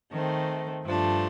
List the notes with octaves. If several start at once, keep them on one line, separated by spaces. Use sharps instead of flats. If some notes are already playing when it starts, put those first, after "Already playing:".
D#3 A3 C4
G2 F3 A3 D4